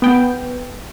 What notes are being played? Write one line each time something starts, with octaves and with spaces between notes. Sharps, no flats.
B3 G5